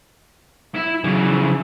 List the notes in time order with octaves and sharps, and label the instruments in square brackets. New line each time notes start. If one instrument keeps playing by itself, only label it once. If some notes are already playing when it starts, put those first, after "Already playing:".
[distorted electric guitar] E4
[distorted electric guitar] C#3 E3 [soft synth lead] F#3
[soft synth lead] F3